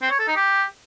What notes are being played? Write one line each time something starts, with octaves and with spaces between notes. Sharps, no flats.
C4
C#5
A4
D#4
G4